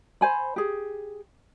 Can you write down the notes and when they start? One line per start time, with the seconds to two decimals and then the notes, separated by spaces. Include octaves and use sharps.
0.21 C5 G#5 B5
0.56 G4 G#4